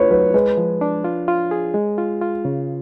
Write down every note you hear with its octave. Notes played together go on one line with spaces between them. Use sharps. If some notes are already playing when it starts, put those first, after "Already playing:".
Already playing: A3 D4 F4 B4 C#5
F#3 B4
G#3 B4
F3
D4
F4
F4
G#4
G#3
F4
F4
C#3